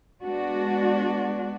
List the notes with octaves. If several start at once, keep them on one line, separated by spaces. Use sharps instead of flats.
G#3 B3 D4 F#4